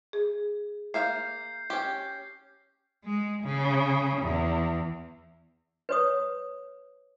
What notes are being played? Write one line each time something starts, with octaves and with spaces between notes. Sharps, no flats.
G#4
A#3 E5 F5 G6 C7
C#4 G4
G#3
C#3
E2
B4 C#5 D#6